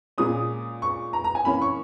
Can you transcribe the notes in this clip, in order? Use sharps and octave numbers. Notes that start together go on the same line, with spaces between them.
A#2 G#3 C#4 D#6
C#6
A#5
A#5
G#5
E3 A#3 C#4 B5
C#6